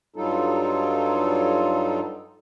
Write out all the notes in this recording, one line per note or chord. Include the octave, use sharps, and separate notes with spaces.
G2 F#3 G3 D#4 F4 A4